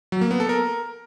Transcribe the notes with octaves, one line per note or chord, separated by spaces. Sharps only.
F#3
A#3
B3
A4
A#4